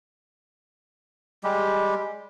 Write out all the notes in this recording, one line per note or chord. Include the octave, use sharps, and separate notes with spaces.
G3 G#3 G4